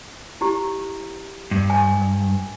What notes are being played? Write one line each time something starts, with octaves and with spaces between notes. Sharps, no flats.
E4 G4
G2
G#5